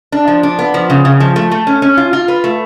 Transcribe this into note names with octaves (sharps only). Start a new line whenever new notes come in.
D4
F3
D4
B3
F3
C#3
C#3
F3
A3
A3
C#4
C#4
F4
F4
B4
A3